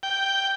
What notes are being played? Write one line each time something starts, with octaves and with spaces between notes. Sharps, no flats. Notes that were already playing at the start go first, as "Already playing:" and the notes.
G5